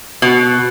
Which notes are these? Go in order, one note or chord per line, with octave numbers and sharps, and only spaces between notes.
B2